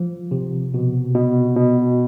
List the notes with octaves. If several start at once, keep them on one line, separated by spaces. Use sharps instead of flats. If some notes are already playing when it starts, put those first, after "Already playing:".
Already playing: F3
C3
B2
B2
B2